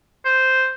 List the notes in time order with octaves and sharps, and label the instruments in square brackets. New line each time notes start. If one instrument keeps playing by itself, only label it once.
[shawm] C5